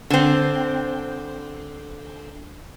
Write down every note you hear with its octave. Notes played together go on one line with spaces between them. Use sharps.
D3 C4